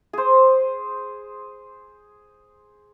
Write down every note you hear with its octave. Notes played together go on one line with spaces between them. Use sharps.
G#4 C5